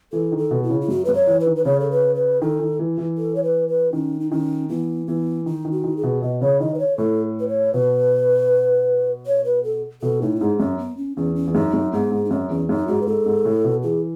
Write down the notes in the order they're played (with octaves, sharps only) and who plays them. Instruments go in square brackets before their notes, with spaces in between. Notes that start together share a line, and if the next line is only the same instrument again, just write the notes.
[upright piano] E3 [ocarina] A4
[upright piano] D#3
[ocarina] A4
[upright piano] B2
[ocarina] E4
[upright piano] C#3
[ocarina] E4
[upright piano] F#2 [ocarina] F#4
[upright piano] F#2 [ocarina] B4
[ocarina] C#5
[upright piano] E3
[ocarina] B4
[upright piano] D#3
[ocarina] B4
[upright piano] C#3 [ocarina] C#5
[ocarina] A4
B4
B4
[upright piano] D#3 [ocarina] A4
[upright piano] D#3
E3
E3
[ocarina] A4
C#5
B4
B4
[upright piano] D#3 [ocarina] C#4
[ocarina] D#4
[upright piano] D#3 [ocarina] C#4
[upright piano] E3 [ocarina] B3
[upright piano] E3 [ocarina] B3
[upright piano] D#3 [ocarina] D#4
[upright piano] D#3
[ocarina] F#4
[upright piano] D#3
[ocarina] G#4
[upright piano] B2
[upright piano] B2 [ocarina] D#5
[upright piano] C#3 [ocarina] C#5
[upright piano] D#3 [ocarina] D#5
[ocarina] B4
C#5
[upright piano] A2 [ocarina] A4
[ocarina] B4
C#5
[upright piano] B2 [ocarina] B4
[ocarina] C#5
B4
A4
[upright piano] B2 [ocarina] A4
[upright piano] A2 [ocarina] D#4
[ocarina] E4
[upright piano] G#2 [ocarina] D#4
[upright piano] F#2 [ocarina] C#4
[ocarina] B3
C#4
[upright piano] E2 [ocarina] C#4
[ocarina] C#4
[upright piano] E2
[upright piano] F#2 [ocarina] D#4
[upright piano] F#2
[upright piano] G#2 [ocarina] B3
[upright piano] G#2
[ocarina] D#4
[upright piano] F#2 [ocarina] C#4
[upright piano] E2 [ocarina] C#4
[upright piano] F#2 [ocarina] D#4
[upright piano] G#2 [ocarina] F#4
[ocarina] B4
[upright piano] G#2 [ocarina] A4
[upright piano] G#2
A2
B2
[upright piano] E3 [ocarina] G#4